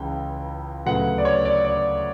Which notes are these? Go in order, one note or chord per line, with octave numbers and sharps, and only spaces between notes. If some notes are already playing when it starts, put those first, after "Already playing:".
Already playing: C#2 C#3 E3 G5
D2 C#3 F#3 B3 F#5
D5
C#5
D5
D5